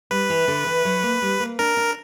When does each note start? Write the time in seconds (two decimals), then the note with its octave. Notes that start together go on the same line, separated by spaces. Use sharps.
0.11 G3 B4
0.30 E3
0.48 D3
0.66 E3
0.85 F#3
1.03 A#3
1.22 G3
1.40 A#3
1.59 D4 A#4
1.77 D4